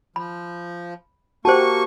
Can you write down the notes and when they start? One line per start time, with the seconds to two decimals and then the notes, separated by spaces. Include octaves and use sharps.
0.16 F3 B5
1.45 A#3 F#4 G4 C5 A5 C#6